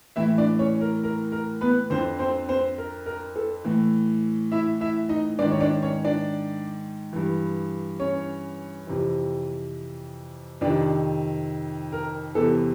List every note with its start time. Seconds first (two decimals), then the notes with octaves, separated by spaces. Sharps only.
0.16 A2 E3 E4 E5
0.38 D4 D5
0.59 C#4 C#5
0.81 A#4
1.03 A#4
1.32 A#4
1.61 B3 B4
1.90 F2 D3 C4 C5
2.19 C4 C5
2.49 C4 C5
2.78 A#4
3.06 A#4
3.36 A4
3.65 A2 E3
4.52 E4 E5
4.81 E4 E5
5.09 D#4 D#5
5.39 G#2 D#3 D4 D5
5.51 C#5
5.60 D4 D5
5.82 C#4 C#5
6.05 D4 D5
7.13 G2 E3
8.00 C#4 C#5
8.87 F2 C3 E3
10.61 F2 C3 D#3 D4 D5
11.92 A#4
12.35 E2 C3 E3 A4